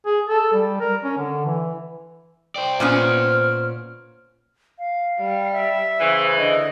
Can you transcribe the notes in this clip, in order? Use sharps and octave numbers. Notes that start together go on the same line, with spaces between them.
G#4
A4
G3
A#4
C#4
D3
E3
C5 D5 G5
A#2 B3 C#4 F6
F5
G3
E5
C#3 E3 C5
D3 D#5